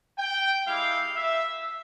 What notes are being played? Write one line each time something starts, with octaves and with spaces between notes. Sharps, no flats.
G5
G#3 E4 G4 F5
E5